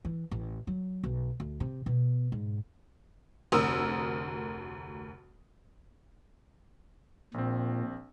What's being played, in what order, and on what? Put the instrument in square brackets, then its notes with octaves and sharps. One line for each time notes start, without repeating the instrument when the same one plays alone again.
[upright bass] E3
A1
F#3
B1
D2
C3
B2
G#2
[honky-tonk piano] F1 D2 A#4 D#6 E6
[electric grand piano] A#1 C4 [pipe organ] A#2